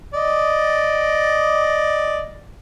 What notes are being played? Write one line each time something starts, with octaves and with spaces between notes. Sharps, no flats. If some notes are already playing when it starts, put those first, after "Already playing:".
D5 D#5